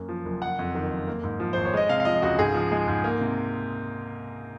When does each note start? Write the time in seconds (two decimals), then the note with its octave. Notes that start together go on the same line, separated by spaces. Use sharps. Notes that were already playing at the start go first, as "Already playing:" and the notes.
Already playing: F#2 A#3
0.09 F3
0.26 F#1
0.42 F#1 F#5
0.59 F2
0.75 D#3
0.91 F#1
1.07 A#3
1.23 G#2
1.40 F3
1.53 G#1 C5
1.65 C#5
1.73 G#3 D#5
1.89 C3 F5
2.00 F5
2.05 F3 D#5
2.22 C#2 F#4
2.39 G#2 G#4
2.54 F3
2.71 G#3
2.88 G#2
3.04 A#3
3.21 C3